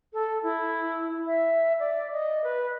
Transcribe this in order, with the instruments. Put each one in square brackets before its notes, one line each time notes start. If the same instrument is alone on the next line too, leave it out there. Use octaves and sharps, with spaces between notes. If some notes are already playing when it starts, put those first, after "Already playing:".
[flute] A4
E4
E5
D5
D#5
B4